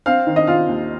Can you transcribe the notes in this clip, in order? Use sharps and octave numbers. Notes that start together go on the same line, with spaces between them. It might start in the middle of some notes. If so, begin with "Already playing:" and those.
C4 F5
D#3
D#5
F4 F5
D#2